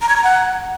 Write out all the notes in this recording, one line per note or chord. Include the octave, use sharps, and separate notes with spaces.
A#5
G#6
A#5
F#5